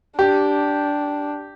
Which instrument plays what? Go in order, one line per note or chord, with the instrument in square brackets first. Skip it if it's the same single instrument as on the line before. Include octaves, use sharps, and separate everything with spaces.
[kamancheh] D4 [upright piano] G4